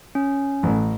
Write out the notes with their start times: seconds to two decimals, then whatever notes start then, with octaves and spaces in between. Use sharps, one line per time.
0.15 C#4
0.63 A1